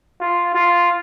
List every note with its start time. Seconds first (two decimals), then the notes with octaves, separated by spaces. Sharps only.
0.21 F4
0.55 F4